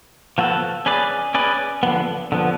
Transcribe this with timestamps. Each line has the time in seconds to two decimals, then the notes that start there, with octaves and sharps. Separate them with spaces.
0.38 F3 B3 F#4 A4
0.86 C#4 G#4 B4 D5
1.34 C#4 G#4 B4 D5
1.83 D3 F3 B3
2.32 D3 F3 B3